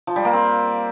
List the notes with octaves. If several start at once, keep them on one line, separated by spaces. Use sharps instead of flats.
F3
G3
A#3
C4